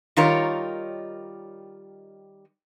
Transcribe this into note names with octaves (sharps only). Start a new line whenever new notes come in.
D#3 G3 D#4 F4 A#4 C#5